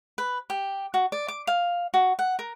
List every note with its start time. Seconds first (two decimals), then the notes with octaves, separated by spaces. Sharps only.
0.18 B4
0.50 G4
0.94 F#4
1.12 D5
1.28 D6
1.47 F5
1.94 F#4
2.19 F#5
2.39 A#4